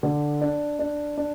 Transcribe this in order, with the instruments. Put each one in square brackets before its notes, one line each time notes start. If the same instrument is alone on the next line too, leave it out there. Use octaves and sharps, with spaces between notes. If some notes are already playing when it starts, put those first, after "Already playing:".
[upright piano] D3
D4
D4
D4